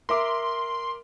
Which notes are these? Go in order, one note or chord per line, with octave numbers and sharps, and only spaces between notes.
A#4 E5 C6 D6